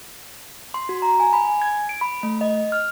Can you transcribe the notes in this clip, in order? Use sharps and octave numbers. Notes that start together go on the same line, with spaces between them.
C6
F#4
A#5
G#5
B5
G#5
G#6
D7
B5
A3
D#5
F6